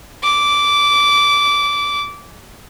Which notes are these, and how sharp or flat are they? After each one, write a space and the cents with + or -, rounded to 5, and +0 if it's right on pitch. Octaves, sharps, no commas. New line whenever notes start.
D6 -15